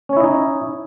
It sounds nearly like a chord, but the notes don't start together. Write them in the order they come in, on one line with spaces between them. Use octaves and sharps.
C#4 C#5 E4 D#5 D#4